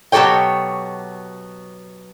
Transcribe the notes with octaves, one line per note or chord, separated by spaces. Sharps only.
B2 F#3 G4 A4 C#5 G5